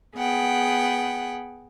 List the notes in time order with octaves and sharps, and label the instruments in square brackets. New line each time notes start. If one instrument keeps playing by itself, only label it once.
[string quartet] B3 G#4 F#5 G5